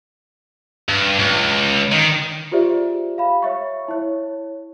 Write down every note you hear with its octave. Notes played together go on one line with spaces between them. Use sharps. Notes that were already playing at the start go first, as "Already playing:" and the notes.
G2
C#2
D#3
F4 G4 G#4 C5 D5 E5
F5 B5
C#5 E5 C#6
E4 C#5